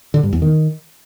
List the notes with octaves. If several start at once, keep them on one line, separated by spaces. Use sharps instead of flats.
D3
G2
E2
D#3